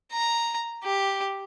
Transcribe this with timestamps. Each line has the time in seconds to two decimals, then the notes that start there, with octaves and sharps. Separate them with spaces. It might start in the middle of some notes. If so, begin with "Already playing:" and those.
0.13 A#5
0.84 G4